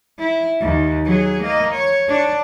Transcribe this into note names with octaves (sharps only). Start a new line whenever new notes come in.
E4
D#2
F#3 G#4
A#3 D#5
C#5
D4